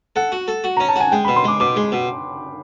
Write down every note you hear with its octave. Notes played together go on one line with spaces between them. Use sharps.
A4 F#5
F#4
A4
F#4
C#4 A#5
A5
F#4 G#5
G#3 G5
B2 B5
C6
G#3 D6
B2 D6
G#3
B2